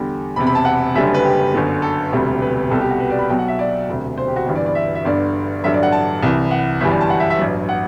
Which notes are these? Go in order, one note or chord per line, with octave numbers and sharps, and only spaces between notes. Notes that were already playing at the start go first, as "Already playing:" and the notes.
Already playing: E2 D3 G3
E1 E2 C3 B5
B5
A5
F#5
F#1 F#2 D3 G3 E5
B4
G4
G1 F#2 D3
A4
E1 D2 C3 G3
B4
C2 B2 G3 A4
G4
F#4
B4
D5
B5
B1 B2 F#3 G5
F#5
E5
D5
E1 D2 C3
C5
G4
F#4
G1 G2 E3 G4
D5
D5
E5
E5
G1 G2 D3 D5
A1 G2 D3 F#3 E5
D5
F#5
A5
C2 C3 E3
F#5
G1 F#2 E3 G3 E5
D5
A5
F#5
E5
E5
A1 G2 F#3
F#5